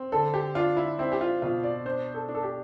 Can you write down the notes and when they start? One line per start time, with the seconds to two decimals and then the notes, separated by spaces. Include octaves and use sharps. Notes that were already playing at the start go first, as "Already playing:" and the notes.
Already playing: C4
0.12 D3 A4
0.34 G4
0.55 D4 F4
0.77 E4
0.99 C4 E4
1.12 G4
1.21 F4
1.42 B2 F4
1.64 D5
1.85 D4 C5
2.14 A4
2.29 D4
2.35 A4
2.43 G4